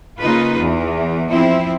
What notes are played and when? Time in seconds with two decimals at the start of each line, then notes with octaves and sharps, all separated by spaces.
0.19 C#3 A#3 D#4 F4 B4
0.58 E2 E3
1.30 F3 C4 E4